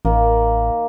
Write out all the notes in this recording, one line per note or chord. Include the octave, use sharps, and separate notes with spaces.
A1 D#3 A#3